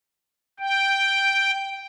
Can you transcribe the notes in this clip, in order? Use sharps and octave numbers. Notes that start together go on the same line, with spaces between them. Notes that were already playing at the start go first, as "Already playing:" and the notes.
G5